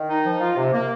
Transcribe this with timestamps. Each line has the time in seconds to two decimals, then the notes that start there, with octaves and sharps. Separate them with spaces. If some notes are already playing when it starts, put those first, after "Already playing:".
Already playing: D#3
0.09 D#4
0.24 F3
0.40 F4
0.56 C3
0.72 A#3